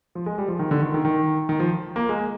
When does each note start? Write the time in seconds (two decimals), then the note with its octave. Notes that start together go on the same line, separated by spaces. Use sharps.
0.15 F3
0.26 G#3
0.38 G3
0.48 F3
0.59 D#3
0.71 D3
0.82 D#3
0.94 D#3
1.05 D#3
1.49 D#3
1.60 F3
1.96 A#3
2.09 G#3